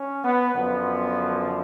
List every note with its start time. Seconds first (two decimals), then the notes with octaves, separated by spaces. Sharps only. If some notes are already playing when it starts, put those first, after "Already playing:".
Already playing: C#4
0.24 B3
0.54 F#2 D3 F3 B3